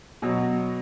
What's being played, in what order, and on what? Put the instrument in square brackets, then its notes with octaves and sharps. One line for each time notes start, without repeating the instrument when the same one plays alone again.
[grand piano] B2 F#3